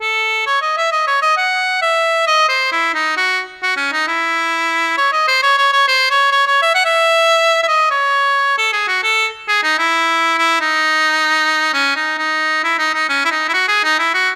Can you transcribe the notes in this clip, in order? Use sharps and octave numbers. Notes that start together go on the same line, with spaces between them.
A4
C#5
D#5
E5
D#5
C#5
D#5
F#5
E5
D#5
C5
E4
D#4
F#4
F#4
C#4
D#4
E4
C#5
D#5
C5
C#5
C#5
C#5
C5
C#5
C#5
C#5
E5
F#5
E5
E5
D#5
C#5
A4
G#4
F#4
A4
G#4
D#4
E4
E4
D#4
C#4
D#4
D#4
E4
D#4
D#4
C#4
E4
D#4
E4
F#4
G#4
D#4
E4
F#4